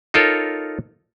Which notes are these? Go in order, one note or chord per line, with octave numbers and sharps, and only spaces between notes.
D#4 F4 A4 A#4 C#5